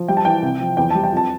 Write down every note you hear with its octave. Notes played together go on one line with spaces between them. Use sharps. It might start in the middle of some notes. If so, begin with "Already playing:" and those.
Already playing: F3
G3 G5
A5
E3 G5
C2
F3
E2 G5
G3 A5
G5
F2 A5